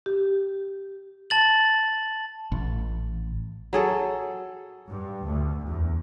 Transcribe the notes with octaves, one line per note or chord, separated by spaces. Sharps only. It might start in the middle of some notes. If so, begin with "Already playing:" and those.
G4
A5 A6 F#7
A1
F#3 G#4 A4
G2
D2
E2